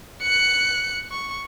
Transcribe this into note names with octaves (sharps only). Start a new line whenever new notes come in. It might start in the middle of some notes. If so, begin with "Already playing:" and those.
F#6 C#7
C#6